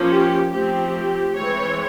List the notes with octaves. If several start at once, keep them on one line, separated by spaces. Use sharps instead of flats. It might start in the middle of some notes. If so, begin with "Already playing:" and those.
Already playing: F3 A#3 C#4
G4
F3 A3 C4 G4
E3 G#3 C4 C#5